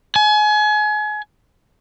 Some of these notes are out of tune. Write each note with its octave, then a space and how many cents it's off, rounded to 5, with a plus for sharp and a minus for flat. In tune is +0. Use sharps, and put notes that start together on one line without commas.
G#5 +30